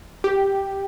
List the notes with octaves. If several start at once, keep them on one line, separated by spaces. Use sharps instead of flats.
G4